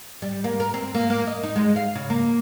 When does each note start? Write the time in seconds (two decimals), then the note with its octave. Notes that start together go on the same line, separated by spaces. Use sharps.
0.22 G3
0.44 A#3
0.60 A#4
0.74 C4
0.94 A#3
1.10 A#3
1.27 D#5
1.43 D#4
1.56 G#3
1.76 F5
1.95 C#3
2.10 A#3